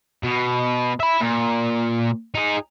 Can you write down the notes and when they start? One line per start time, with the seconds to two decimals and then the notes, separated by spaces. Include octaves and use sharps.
0.23 B2
1.00 E5 B5
1.20 A#2
2.34 D#4 G#4